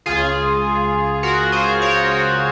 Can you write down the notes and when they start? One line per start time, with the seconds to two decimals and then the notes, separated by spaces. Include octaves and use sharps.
0.06 C#2 C#3 F4 G#4
1.23 F#4 A#4
1.52 G#4 C5
1.82 A#4 C#5
2.11 F#4 A#4